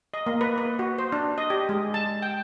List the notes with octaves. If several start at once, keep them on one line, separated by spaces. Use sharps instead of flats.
D#5
A#3
B4
B4
F#4
C5
D4
D#5
G4
G#3
A5
G5